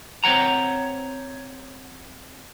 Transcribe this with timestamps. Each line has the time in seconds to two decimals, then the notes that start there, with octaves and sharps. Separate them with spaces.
0.24 C4 C5 C#5 F#5 A#5